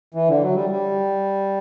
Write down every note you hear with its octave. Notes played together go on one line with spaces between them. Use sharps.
E3
D3
F#3
G3
G3